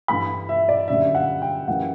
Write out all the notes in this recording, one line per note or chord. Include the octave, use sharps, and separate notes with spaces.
G2 E3 A3 B5
E5
D5
F#2 D3 G3 E5
F#5
G5
F#2 E3 G3 F#5